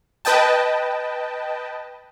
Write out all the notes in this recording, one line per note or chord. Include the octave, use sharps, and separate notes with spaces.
B4 D#5 G5 A5